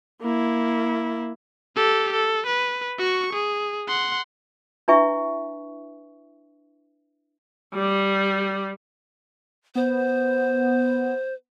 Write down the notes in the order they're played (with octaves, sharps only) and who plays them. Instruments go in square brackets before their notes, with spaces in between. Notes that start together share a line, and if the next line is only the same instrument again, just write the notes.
[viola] A#3 E4
[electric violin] G4 A4
A4
B4
F#4 C#6
G#4
F#5 C6
[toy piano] D4 E4 B4 E5 G#5 C#6
[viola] G3
[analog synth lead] B3 [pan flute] C5